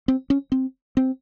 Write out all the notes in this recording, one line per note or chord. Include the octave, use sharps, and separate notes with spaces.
C4
C#4
C4
C4